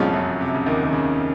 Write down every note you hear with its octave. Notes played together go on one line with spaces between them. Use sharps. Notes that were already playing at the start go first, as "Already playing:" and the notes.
Already playing: C2 F2 A#2 F3 G#3 C#4
F#2 F#3
C3
C#3
D#2 D#3
D#3
C#3